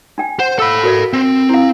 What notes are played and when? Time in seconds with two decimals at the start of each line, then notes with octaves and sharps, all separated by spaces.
0.18 D4 G5
0.39 C5 F#5
0.59 A4 F5 B5 E6
0.83 F#4 A#4 D5
1.13 C4
1.50 E4 F5